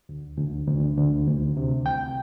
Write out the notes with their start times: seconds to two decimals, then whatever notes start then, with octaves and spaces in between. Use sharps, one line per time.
0.09 D2
0.38 D2
0.68 D2
0.98 D2
1.28 D2
1.57 C3
1.86 C2 G5